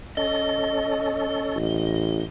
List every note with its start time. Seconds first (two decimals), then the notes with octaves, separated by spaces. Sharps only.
0.17 C#4 A4 D#5
1.56 A1